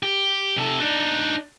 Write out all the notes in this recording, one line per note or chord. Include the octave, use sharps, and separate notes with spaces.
G4
C3 A4
D4 D#4